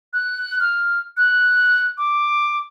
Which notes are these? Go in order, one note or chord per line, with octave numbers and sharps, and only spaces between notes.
F#6
F6
F#6
D6